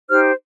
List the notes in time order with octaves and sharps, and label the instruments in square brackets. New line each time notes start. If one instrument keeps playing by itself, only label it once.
[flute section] D#4 G4 C5 F6